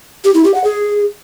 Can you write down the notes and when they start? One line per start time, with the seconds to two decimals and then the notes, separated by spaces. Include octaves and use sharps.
0.24 G4
0.34 E4
0.44 G4
0.54 F#5
0.64 G#4